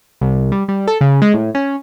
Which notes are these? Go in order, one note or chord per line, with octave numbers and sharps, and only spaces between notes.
C2
G3
G3
A4
C#3
G#3
A2
C#4